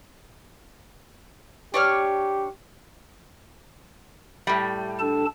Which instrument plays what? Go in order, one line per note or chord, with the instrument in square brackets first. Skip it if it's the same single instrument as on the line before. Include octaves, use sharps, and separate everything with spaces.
[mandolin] D4 C#5 F6 [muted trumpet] G4
[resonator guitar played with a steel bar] A2 G3
[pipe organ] D4 A4 A5